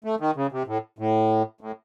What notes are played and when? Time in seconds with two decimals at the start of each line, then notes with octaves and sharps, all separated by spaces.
0.04 A3
0.20 D#3
0.36 C#3
0.52 C3
0.67 A2
0.98 A2
1.61 A2